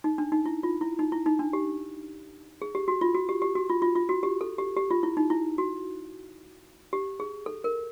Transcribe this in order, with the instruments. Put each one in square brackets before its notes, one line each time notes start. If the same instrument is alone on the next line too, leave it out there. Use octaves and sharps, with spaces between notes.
[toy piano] D#4
D4
D#4
E4
F4
E4
D#4
E4
D#4
D4
G4
G#4
G4
F#4
F4
F#4
G4
G4
F#4
F4
F4
F4
F#4
G4
A4
G4
G4
F4
E4
D#4
E4
F#4
G4
G#4
A4
A#4